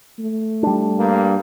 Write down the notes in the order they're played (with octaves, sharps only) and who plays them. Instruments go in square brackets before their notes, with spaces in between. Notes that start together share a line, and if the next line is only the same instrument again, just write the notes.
[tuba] A3
[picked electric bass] G3 D4
[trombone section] G2 A#3